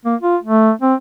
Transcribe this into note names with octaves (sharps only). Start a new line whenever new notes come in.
A#3
F4
A3
C4